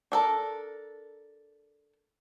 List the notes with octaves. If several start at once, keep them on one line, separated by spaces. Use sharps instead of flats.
D4 A4 A#4